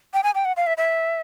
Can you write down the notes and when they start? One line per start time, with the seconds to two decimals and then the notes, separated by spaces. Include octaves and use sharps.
0.14 G5
0.24 G#5
0.35 G5
0.45 F#5
0.57 F5
0.67 E5
0.77 E5